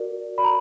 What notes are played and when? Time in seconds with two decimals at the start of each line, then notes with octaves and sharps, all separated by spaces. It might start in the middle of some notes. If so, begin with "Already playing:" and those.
Already playing: F#4 A#4 D5
0.38 F#4 D5 B5
0.44 A#5